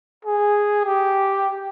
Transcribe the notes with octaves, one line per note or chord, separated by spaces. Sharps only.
G#4
G4